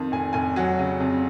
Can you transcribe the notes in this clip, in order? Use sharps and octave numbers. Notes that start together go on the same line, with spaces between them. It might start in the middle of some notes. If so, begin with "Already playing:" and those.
Already playing: F2 D#3
F1 G#5
F1 G#5
F#3 F#5
C#3
F2